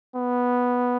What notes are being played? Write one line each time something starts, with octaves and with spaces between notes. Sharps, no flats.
B3